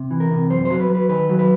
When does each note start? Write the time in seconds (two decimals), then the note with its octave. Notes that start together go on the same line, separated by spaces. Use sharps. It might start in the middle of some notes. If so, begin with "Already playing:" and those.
Already playing: C3
0.11 E3
0.20 A#4
0.31 C3
0.50 F#2 C5
0.65 F#3 C5
0.80 B4
0.90 F#3
0.95 B4
1.09 D#3 B4
1.30 F#3
1.39 B4